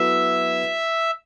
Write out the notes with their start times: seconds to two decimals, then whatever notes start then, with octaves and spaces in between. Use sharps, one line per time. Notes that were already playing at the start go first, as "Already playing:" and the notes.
Already playing: F#3 B3 E4 A4 E5